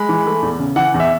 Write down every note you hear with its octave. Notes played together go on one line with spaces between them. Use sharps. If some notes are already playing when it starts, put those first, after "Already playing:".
Already playing: G#3 B5
E3
A3
E2
C#3
E3 F#5
E2
E5